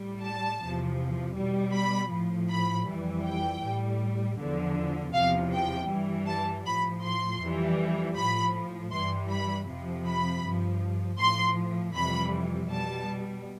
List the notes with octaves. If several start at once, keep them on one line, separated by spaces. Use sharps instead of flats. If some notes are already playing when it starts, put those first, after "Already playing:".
Already playing: A2 G3
A5
E2 C3 F3
B2 G3
B5
A2 F3
B5
F2 E3 G3
G5
A2 G3
E2 D3 F3
E2 C3 F3 F5
G5
G2 E3 G3
A5
A2 F3 B5
C6
F2 E3 G3
A2 F3 B5
G2 E3 G3 C6
B5
F2 C3 F3
B5
G2 F3
A2 F3 C6
F2 C3 E3 G3 B5
B2 G3 A5